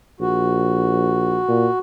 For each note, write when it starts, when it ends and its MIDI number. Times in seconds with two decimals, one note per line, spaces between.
0.21 1.40 34
0.21 1.79 66
1.48 1.69 46